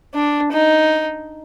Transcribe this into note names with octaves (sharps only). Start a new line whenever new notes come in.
D4
D#4